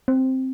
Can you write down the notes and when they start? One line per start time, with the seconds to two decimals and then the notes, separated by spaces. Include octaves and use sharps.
0.08 C4